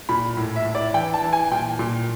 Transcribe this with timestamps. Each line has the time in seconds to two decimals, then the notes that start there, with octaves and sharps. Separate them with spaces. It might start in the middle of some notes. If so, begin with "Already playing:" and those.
0.09 A#2 B5
0.37 A2
0.56 E5
0.65 A2
0.75 D5
0.94 E3 G5
1.14 A5
1.22 E3
1.33 G#5
1.51 A#2 G5
1.79 A#2